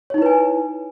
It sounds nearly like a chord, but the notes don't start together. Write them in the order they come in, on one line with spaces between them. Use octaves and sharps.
C#5 D#4 E4 B4 G#5